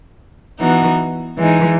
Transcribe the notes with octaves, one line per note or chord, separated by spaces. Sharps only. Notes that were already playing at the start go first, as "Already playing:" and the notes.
E3 B3 D#4 F#4
E3 G#3 D#4